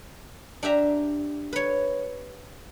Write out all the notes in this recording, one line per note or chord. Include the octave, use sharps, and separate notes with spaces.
D4 G4 E5 A#5
B4 C#5